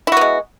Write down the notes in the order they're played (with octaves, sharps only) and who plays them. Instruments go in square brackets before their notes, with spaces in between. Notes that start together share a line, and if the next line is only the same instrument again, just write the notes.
[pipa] E4
F#4
B3
G#3